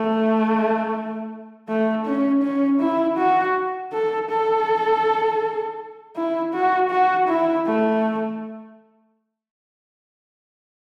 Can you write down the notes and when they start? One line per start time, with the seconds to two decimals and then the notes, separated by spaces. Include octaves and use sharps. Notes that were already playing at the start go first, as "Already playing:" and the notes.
Already playing: A3
1.69 A3
2.06 C#4
2.43 C#4
2.81 E4
3.18 F#4
3.93 A4
4.30 A4
6.16 E4
6.54 F#4
6.91 F#4
7.28 E4
7.66 A3